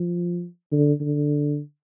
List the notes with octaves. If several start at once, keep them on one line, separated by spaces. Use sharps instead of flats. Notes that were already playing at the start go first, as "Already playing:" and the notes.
Already playing: F3
D3
D3